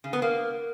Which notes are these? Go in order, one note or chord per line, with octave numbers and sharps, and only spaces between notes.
C#3
B3
A#3